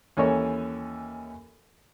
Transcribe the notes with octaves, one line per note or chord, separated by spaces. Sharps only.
D#2 E3 C#4 A4 A#4 C#5